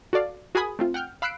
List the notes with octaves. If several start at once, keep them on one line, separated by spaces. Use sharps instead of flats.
F#4 A4 D5 F5
F#4 G#4 A#4 G#5 B5 D#6
A3 C4 F4
F#5 G5 F6 G6
F5 B5 E6 F#6 C7 D7